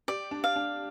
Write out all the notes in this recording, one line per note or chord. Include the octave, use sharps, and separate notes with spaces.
G4 D5
D4
F5
D4